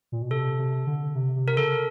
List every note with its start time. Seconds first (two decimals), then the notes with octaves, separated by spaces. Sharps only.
0.12 A#2
0.22 B2
0.30 C3 A4
0.58 C3
0.87 D3
1.15 C3
1.36 C3
1.48 A#4
1.57 C#3 A4